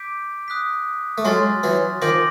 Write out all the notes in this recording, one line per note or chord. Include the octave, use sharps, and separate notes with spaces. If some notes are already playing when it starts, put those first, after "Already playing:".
Already playing: D6 G6 B6 D7
D#6 F#6 B6
A3
F#3 G#3 G#5 C6 F6 A6
E3 F#3
D#3 F3 D6 G6 A#6 D7 F#7